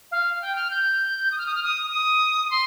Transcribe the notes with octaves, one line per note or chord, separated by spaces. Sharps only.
F5
G5
F6
G6
D#6
F6
D#6
F6
D#6
D#6
C6